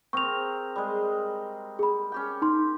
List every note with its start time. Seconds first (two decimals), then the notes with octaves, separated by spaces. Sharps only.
0.13 C4 G#4 A#4 C#6 F7
0.76 G3 G#3
1.79 G#4 B5
2.12 C#4 G4 G5
2.42 D#4 C6